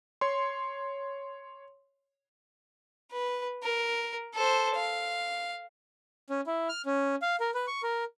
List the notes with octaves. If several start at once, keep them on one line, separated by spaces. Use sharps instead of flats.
C#5 C6
B4
A#4
A4 C5
F5
C#4
E4
F6
C#4
F5
A#4
B4
C#6
A#4